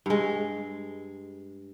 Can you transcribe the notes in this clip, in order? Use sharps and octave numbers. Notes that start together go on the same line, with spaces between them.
G2 G#3